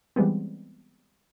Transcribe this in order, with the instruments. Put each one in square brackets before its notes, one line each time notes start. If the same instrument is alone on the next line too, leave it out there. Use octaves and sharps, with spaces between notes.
[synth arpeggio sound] E3 G3 G#3 B3 C4